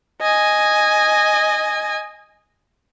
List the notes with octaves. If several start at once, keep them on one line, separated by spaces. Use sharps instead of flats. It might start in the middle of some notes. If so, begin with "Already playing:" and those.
D#5 G#5